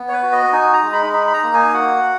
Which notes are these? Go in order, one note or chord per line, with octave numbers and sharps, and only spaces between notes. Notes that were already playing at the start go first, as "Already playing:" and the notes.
Already playing: B3
C#5
B4
F#4
D#5
D#4 G#5
A#5
G#3
B5
D#4 B5
B5
A#5
A#3
G#5
F#4 F#5